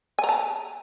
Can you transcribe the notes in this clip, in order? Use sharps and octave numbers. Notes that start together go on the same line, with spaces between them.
G#5
A#5
A5